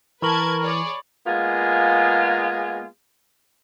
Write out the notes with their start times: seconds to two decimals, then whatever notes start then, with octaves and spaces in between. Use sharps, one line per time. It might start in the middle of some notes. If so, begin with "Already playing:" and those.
0.22 E3 A#4 B4 A5 B5 C#6 G#6 F#7
0.60 G#4 C#5 D5
1.27 G#3 A#3 B3 F4 G#4